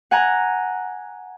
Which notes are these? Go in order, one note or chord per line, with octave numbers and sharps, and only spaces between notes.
F#5 G#5 A#5